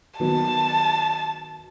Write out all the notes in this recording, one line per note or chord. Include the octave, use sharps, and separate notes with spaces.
D#3 F#3 B3 A5